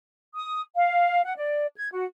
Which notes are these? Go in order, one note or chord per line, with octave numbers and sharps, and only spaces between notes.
D#6
F5
F#5
D5
G#6
F#4